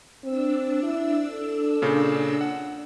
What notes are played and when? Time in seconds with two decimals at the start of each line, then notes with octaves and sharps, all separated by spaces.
0.24 C4 D4 E6
0.83 E4
1.31 A4
1.82 A#2 C#3
2.41 F#5